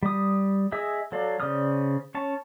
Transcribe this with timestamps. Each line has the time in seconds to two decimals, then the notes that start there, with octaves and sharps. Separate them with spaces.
0.03 G3 D#6
0.72 G#4 D#5 E5 E6
1.12 F#3 A4 D5 F5
1.40 C#3 C5 D5 D#6 F6
2.15 C#4 C#5 A5